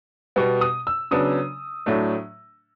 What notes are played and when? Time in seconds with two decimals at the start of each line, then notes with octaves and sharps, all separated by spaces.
0.36 B2 G3 B3
0.61 D#6
0.87 E6
1.11 C#3 F#3 B3 D4 D#6
1.86 A2 F#3 A3 D4